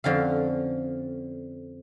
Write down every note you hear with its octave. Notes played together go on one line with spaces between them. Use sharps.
F2 D3 C#4 F5